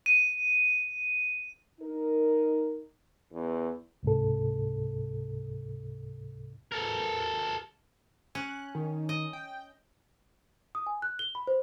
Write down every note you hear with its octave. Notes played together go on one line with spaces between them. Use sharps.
D#7
D#4 A#4
E2
C#2 G#2 C3 A4
A4 A#4
C#4 F#6
D#3
D#5
G5
D#6
G#5
F#6
G7
B5
C5